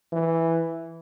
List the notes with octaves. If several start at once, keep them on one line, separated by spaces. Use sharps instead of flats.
E3